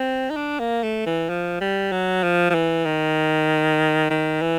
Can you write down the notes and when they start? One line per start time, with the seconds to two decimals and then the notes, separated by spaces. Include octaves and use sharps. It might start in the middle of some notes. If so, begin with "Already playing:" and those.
Already playing: C4
0.30 D#4
0.36 D4
0.59 A#3
0.83 A3
1.06 E3
1.29 F3
1.61 G3
1.91 F#3
2.23 F3
2.50 F3
2.54 E3
2.85 D#3
4.10 D#3
4.41 E3